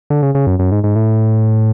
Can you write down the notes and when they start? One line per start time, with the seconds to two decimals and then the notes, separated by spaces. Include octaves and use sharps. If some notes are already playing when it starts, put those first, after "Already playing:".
0.10 D3
0.23 C#3
0.35 C#3
0.47 F#2
0.59 F#2
0.72 G#2
0.84 G#2
0.96 A2